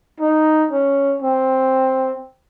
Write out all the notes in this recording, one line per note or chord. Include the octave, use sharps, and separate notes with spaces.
D#4
C#4
C4